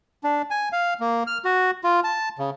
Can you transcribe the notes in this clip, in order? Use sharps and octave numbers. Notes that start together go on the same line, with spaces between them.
D4
G#5
F5
A#3
F6
F#4
F4
A5
C#3